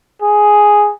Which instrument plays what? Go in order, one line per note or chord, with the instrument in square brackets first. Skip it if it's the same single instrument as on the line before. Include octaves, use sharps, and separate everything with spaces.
[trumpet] G#4